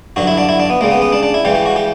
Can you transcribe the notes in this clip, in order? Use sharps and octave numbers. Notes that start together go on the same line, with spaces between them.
G2 D3 F#3 F#4
E4
D4
E4
D4
B3
C#2 C#3 G3 A#3
B3
B3
D4
D4
E4
C#2 C#3 E3 G3 G4
G4
F#4
G4